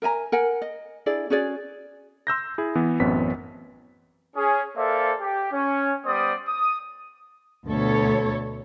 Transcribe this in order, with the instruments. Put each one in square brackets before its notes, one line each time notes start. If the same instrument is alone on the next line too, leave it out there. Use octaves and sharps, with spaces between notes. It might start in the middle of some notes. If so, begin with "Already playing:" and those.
[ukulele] A#4 E5 G#5 A#5
A#4 F#5 G#5
D#5
D4 E4 G#4 D5
C#4 F#4 G#4 D5
[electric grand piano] C6 E6 G6 A#6
E4 G#4
E3 B3
A1 F#2 B3 C4 B6
[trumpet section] C#4 G#4
A#3 A4 C5 D5 E5 F5
G4
C#4
G3 B3 C5 D5 D#6
D#6
[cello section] D2 B2 A4 C#5